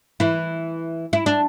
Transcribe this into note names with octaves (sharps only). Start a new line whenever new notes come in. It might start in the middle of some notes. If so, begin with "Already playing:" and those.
E3 E4
E4
D4